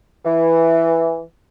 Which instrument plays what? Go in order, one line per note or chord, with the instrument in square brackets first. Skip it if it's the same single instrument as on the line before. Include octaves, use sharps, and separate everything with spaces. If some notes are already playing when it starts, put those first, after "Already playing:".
[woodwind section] E3